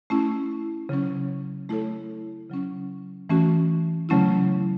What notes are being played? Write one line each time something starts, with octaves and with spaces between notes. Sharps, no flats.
A3 C#4 E4
C#3 F#3 C#4
A3 E4 A4 C#5
C#3 F#3 C#4
E3 A3 C#4 F#4
C#3 F#3 A3 C#4 E4